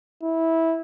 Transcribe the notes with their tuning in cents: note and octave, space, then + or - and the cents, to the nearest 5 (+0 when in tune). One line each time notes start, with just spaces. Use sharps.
E4 -15